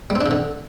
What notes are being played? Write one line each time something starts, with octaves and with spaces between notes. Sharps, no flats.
G3
C4
D4
C3
D3